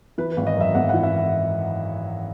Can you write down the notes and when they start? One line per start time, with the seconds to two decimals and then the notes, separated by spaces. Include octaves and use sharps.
0.18 E3 B4
0.32 B4
0.37 G#1
0.47 D#5
0.56 F#2 E5
0.75 G#1 F#5
0.89 F#5
0.94 E3
1.03 E5
1.17 E5